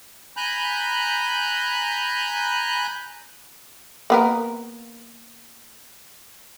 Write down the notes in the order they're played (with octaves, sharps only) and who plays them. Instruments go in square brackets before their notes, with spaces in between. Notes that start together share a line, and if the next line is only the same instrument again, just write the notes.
[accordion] G#5 A#5 B5 F#6 G6
[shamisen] A#3 B3 A#4